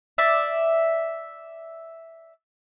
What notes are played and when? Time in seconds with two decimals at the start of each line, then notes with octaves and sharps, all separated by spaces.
0.18 D5 E5